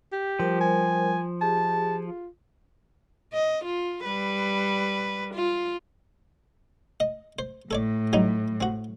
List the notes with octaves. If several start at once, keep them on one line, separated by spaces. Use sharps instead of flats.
G4
F3 G3 A#4 C5
G#5
G4 G#4 A5
F4
D#5
F4
G3 B4
F4
D#5
C5
A2 A4 C#5 D5
F#3 G3 D#4
C4 F#4